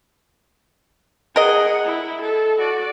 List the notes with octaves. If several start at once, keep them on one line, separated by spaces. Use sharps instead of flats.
G#4 A#4 D#5 F#5
E4
A4
F#4 D5